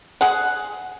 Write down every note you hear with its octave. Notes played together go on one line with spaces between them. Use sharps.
G#4 F#5